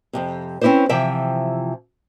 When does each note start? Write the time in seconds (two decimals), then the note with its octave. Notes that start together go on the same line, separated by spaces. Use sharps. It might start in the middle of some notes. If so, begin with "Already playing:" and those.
0.13 F2 A2 C3
0.61 C4 C#4 E4 G#4 B4 C5
0.89 C3 E3 F3 E5 G5